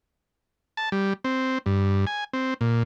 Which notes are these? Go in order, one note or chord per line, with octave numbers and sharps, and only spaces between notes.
A5
G3
C4
G2
G#5
C4
A#2